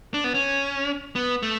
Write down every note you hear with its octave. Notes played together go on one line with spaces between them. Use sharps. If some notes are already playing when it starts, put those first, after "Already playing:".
D4
B3
C#4
B3
A3